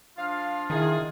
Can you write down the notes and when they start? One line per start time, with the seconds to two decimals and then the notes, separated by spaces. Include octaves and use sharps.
0.18 F3 D4 F4 F5
0.70 D#3 E4 G#4 E5